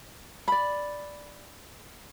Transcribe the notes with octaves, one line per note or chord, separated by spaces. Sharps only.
D5 B5